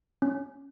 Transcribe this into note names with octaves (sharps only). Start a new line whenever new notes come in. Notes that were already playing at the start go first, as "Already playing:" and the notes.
C#4